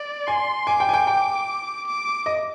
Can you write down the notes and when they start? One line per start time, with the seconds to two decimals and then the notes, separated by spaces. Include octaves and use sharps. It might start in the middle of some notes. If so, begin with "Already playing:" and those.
Already playing: D5
0.27 G#5 C6
0.67 G#5 D6
0.80 G5
0.89 G#5
0.93 G5
1.07 G5
1.87 D6
2.26 D#5